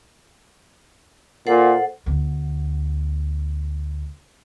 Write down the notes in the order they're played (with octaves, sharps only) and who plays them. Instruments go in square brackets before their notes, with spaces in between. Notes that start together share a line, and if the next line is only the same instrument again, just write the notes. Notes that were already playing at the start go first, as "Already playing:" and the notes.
[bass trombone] A#2 [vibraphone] A4 C5 F#5
[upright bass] D2 B3